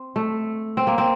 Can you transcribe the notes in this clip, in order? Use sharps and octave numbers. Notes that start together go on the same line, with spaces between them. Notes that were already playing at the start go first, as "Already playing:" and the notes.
Already playing: C4
A3
C4
A#3
C4